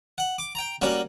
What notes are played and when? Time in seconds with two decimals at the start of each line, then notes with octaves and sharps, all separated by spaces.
0.18 F#5
0.38 D6
0.55 G5 A#5
0.82 G3 A#3 C#4 F#4